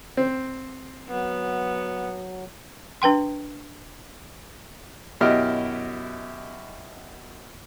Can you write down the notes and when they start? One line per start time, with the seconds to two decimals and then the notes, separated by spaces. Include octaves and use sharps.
0.17 C4
1.09 F#3 B3
3.02 D4 B4 G5 C6
5.21 F#2 B2 E4 G4 D#5 F6